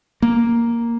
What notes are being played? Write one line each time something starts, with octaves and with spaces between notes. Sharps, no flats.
A#3